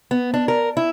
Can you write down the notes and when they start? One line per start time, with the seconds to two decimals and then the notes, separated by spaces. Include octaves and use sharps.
0.11 B3
0.34 D4
0.48 A#4
0.77 E4